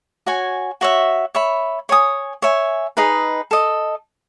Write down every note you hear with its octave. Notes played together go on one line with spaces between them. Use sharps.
F#4 C#5 G#5
F#4 C#5 E5
C#5 E5 B5
C#5 G#5 D#6
C#5 E5 G#5
D#4 G#4 B4
A4 D#5